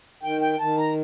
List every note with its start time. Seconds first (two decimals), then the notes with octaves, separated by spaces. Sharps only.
0.23 D#3 G5
0.41 G5
0.60 D#3 A5
0.77 A#5